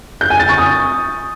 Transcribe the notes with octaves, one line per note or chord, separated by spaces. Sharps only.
G6
G#5
A6
C#6
D#6